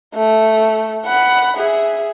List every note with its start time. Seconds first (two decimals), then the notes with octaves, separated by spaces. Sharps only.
0.15 A3
1.06 F#5 B5
1.57 G#4 E5